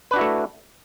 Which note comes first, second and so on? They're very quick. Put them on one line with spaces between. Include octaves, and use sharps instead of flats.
B4 D4 F#4 E4 A3